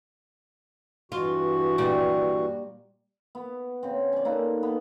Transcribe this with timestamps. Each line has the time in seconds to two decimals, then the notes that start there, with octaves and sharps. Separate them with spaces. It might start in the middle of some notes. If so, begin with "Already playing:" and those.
1.12 G2 E3 F4 F#4
1.78 A#2 G3 D5
3.35 B3
3.83 C#3 C4
4.13 C#4 D5
4.25 A#3 D#4 A4 B4
4.63 B3